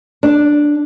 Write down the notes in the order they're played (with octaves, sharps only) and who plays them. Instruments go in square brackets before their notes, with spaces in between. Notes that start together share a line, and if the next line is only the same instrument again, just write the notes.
[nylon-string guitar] D4